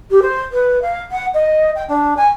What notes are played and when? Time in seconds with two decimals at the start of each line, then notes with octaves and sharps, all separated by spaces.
0.10 G4
0.22 C5
0.52 B4
0.82 F5
1.11 F#5
1.34 D#5
1.75 G5
1.88 D4
2.17 G#5